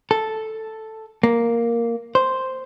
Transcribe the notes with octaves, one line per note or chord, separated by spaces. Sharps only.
A4
A#3
C5